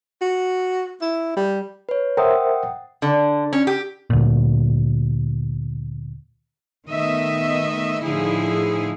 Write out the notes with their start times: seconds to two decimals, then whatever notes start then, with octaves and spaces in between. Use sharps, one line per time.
0.22 F#4
1.02 E4
1.37 G3
1.89 B4 C#5
2.17 A#4 C5 E5 F#5 G5 D#6
3.02 D3
3.53 C#4
3.67 G4
4.10 D2 A#2
6.87 D#3 A3 B3 D#5 E5
8.04 A2 D3 F3 D#4 E4 G#4